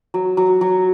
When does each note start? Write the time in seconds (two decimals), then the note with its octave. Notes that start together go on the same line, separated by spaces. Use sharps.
0.14 F#3
0.37 F#3
0.61 F#3